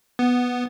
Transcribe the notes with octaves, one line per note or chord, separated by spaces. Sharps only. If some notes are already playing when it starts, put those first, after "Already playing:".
B3